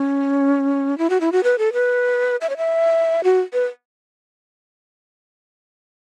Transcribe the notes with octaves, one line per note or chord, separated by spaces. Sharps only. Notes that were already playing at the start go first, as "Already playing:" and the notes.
Already playing: C#4
E4
F#4
E4
F#4
B4
A4
B4
E5
C#5
E5
F#4
B4